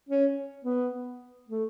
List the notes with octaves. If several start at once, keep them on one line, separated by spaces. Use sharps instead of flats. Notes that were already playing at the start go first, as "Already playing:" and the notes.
C#4
B3
A3